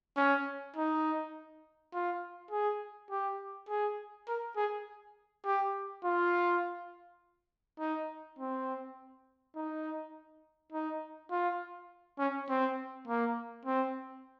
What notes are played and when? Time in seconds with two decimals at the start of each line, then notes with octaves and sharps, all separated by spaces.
0.17 C#4
0.76 D#4
1.94 F4
2.51 G#4
3.11 G4
3.69 G#4
4.28 A#4
4.56 G#4
5.45 G4
6.04 F4
7.79 D#4
8.39 C4
9.56 D#4
10.72 D#4
11.31 F4
12.19 C#4
12.49 C4
13.08 A#3
13.65 C4